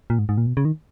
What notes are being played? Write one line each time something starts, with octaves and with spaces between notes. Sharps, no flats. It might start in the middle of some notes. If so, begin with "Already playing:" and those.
A#2
G#2
G#2
A#2
B2
C#3
D#3